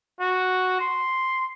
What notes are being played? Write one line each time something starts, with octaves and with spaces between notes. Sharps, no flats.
F#4
C6